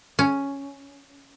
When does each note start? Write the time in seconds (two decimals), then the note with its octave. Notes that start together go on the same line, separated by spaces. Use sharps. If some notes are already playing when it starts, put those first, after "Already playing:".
0.19 C#4